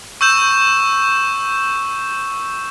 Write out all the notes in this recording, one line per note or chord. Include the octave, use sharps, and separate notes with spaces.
C#6 E6 G6 E7